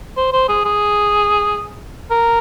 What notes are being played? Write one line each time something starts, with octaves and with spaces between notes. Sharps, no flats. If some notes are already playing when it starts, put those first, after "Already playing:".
C5
C5
G#4
G#4
A#4